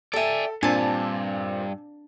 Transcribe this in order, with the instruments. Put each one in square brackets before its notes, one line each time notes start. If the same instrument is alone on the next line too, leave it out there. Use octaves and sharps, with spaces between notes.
[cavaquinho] G4 E5 [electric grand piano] A4 [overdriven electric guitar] D5 G#5
[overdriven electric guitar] G2 [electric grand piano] A#2 C4 [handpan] D4 [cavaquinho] G#5 A5